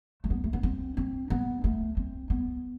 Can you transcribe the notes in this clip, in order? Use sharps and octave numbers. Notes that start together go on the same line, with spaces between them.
A3
B3
A3
B3
C4
C4
B3
A3
C4
B3